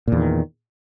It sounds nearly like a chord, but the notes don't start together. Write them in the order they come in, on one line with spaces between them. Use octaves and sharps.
A#2 E2 D#3